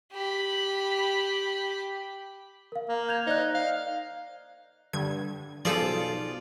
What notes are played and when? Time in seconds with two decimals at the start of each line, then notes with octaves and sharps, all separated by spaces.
0.12 G4 B5
2.72 A#4 F5
2.89 A#3
3.09 G6 G#6 F7
3.27 D#4 C5 D5 F#6
3.55 F5
4.93 G2 D3 G#6
5.65 B1 F3 F4 G#4 A4 D5